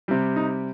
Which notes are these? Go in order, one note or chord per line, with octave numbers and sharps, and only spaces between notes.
C3 G3
D#4